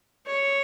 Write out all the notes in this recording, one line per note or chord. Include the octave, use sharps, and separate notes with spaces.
C#5